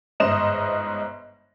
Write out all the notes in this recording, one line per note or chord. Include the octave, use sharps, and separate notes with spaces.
G1 G#2 C5 D#5 D#6 E7